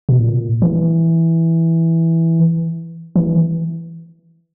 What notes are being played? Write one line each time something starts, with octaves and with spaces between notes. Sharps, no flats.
B2
A#2
E3
E3